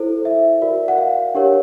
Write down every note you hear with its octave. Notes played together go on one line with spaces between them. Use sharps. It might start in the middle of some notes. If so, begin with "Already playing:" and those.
Already playing: E4 A4 C5
E5
F#4 A#4 D5
F#5
F5
D4 G4 A#4 C#5